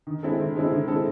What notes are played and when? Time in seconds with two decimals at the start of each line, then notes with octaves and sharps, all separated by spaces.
0.07 D#3
0.23 G#3 C4 E4 A4
0.40 D#3
0.56 G#3 C4 E4 A4
0.72 D#3
0.88 G#3 C4 E4 A4